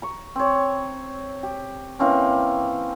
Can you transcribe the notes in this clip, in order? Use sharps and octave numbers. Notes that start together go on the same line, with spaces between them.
A#5 C#6
C4 C#5
G4
E3 A#3 C4 C#4